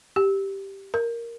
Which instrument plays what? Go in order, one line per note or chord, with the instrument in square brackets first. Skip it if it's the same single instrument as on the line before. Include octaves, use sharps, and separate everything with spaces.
[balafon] G4
A#4